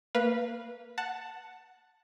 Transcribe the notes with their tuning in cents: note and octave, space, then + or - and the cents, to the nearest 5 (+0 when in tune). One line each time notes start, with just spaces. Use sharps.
A#3 -20 B4 -15 F5 -5
F#5 +0 A5 +10